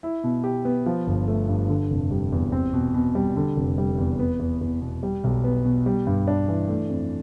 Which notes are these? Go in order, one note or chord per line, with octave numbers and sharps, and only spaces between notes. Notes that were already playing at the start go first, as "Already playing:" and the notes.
E4
B2
G4
B3
F3
G1
A3
G2
D3
F1
G3
E2
C4
B2
B2
G3
D3
F1
G3
E2
B3
E2
E2
B2
G3
B1
B3
B2
G3
G2
D4
E3
A3
F2